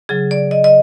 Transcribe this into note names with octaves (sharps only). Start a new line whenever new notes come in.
C#3 F#3 G#4
D5
D#5
D#5